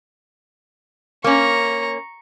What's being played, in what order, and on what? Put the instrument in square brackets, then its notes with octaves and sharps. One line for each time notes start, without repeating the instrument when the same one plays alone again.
[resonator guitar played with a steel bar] A#3 C#4 [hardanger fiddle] A#5 C#6